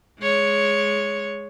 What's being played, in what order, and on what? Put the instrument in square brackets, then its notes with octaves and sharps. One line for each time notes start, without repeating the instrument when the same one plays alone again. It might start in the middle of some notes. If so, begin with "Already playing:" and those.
[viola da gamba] G#3 C#5